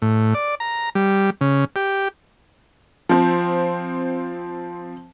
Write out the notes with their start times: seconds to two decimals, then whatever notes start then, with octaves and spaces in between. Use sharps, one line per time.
0.02 A2
0.34 D5
0.60 A#5
0.95 G3
1.41 C#3
1.76 G4
3.09 F3 C4